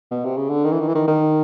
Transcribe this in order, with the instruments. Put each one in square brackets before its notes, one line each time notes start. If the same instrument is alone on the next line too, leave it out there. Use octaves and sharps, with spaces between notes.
[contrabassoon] B2
C3
C#3
D3
D#3
E3
D#3
E3
D#3
D#3